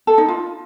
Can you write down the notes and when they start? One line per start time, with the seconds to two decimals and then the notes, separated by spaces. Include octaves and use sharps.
0.07 A4
0.18 D#4
0.28 F4